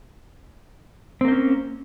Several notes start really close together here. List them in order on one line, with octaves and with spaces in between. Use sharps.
C4 A#3 C5 C#4